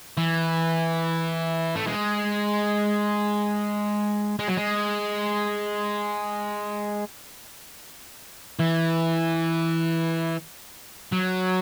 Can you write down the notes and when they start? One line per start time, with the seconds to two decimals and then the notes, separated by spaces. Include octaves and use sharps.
0.17 E3
1.76 A3
1.87 G#3
4.39 G#3
4.48 F#3
4.57 G#3
8.59 E3
11.12 F#3